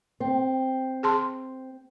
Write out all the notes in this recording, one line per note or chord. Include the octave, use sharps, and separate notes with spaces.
C4
G#4 A5 C6